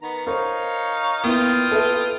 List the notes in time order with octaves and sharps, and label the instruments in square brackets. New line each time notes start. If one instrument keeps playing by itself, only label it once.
[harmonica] D#3 B3 A#5
[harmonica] D#4 C#5 F5 [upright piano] A#4 C5
[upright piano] A#3 B3 E4 [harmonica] F4 G5 D#6
[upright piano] A4 B4 E5